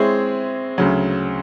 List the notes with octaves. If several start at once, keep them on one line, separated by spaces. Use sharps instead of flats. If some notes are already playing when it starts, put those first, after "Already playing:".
Already playing: G#3 C4 E4 G#4 C#5
D2 C#3 F#3